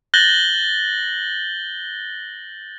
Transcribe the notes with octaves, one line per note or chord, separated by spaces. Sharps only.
F#6 G6 A6 A#6 F#7 G7